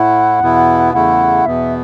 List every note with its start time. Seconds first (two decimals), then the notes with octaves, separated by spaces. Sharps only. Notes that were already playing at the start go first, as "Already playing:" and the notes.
Already playing: A2 A3 E4 F#5
0.40 E2 B2 B3 E4
0.93 E2 C#3 A3 E4 F#5
1.45 E2 B2 B3 E5